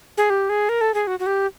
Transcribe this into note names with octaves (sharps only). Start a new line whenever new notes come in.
G#4
G4
G#4
A#4
A4
G#4
F#4
F#4
G4